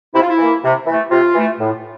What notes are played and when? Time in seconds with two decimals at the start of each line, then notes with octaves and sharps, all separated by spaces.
0.14 C3 E4
0.22 F4
0.29 E4
0.38 E3 A#3
0.63 C3
0.86 E3 A3
1.11 C3 F4
1.35 E3 A3
1.60 A2